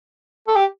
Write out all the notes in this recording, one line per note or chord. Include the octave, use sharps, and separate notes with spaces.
A4
G4